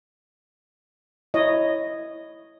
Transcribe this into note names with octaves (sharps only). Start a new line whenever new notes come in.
E4 C#5 D#5